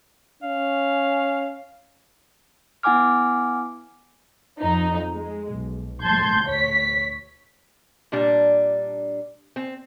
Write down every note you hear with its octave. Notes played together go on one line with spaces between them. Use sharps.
C#4 F5
B3 E4 F#5 G#5 D6 F6
F2 D#4
G#3
B1
A5 C6 G6 G#6
D2 C#5 B6
A#2 G3 D4
C4